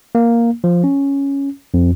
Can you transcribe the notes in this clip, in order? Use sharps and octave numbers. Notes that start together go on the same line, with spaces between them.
A#3
F3
C#4
F2